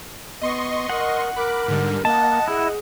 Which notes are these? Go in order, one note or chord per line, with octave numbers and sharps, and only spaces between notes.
B3 D#5 C6 C#6
A#4 F#5
A#4 B5 D6 F#6
G#2 D3 G3
A#3 D#5 F#5 A5
E4 G#4